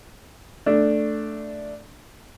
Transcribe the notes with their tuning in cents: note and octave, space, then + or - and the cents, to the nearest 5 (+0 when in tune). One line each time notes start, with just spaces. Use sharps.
A3 +0 D4 +0